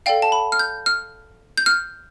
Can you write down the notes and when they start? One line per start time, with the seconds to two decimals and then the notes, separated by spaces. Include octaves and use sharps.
0.06 A4 D5 F5 G5
0.22 A5
0.32 B5
0.52 F6
0.59 G6
0.86 F6
1.57 G6
1.66 F6